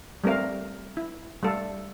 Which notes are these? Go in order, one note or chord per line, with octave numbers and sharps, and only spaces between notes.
G3 A3 C4 A#4 F5
E4
G3 A3 A4 F5